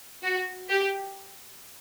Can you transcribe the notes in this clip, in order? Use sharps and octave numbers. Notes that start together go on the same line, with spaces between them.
F#4
G4